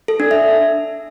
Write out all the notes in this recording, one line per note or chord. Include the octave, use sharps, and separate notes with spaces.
A4
D4
E5